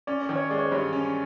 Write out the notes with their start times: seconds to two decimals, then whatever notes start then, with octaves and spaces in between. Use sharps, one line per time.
0.07 C#4 D5
0.22 D5
0.29 D#3
0.35 C#5
0.50 G#3 D5
0.58 C#5
0.65 C5
0.72 G2 C#5
0.93 C#4